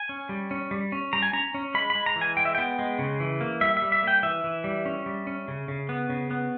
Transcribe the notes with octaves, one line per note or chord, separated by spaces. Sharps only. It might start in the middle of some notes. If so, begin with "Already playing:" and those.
Already playing: G#5
C#4
G3
C#4
G3
C#4
G3 A#5
G#5
C#4 A#5
C#4
G#3 B5
B5
G#3
A#5
E3
G#5
G#3 G5
E5
B3 G5
G#3
C#3
E3
A#3
G3 E5
E5
G3
E5
A#3 G5
E3 E5
E3
G3
C#4
G3
C#4
C#3
C#3
B3
C#3
B3